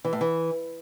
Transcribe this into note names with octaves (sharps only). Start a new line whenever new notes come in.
E3
A2
E3